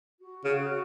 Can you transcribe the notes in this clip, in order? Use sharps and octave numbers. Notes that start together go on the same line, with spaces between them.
F#4
C#3 F#4